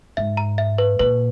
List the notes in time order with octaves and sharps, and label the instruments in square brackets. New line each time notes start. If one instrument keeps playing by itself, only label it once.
[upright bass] G#2 [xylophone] E5
[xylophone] A#5
E5
B4
[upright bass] A#2 [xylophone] B4